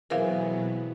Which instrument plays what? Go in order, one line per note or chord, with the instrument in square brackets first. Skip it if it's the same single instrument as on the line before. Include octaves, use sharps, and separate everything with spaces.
[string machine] B2 F#3 B3 [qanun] E3 C4 G#4 [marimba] A#4 F5